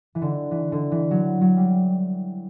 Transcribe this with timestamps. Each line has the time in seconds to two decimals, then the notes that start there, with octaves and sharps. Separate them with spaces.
0.15 E3
0.21 D3
0.51 E3
0.72 D3
0.92 E3
1.11 F#3
1.41 F#3
1.57 G3